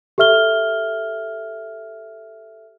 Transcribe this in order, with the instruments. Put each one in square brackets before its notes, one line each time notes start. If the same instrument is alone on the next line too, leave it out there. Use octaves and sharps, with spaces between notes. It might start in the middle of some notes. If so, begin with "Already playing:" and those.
[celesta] G4 A4 E5 F6 G7